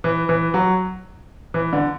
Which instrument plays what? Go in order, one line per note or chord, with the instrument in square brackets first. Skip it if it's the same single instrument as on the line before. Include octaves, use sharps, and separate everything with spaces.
[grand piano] E3
E3
F#3
E3
D3